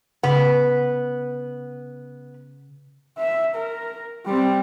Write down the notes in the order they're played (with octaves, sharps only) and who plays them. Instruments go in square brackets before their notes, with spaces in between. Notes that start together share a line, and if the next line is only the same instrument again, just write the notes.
[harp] C#3 B6 [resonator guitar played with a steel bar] B3
[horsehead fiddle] E5
A#4
G3 C4